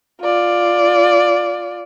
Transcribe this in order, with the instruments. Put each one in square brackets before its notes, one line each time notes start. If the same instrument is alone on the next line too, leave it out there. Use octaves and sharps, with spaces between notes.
[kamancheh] F4 D5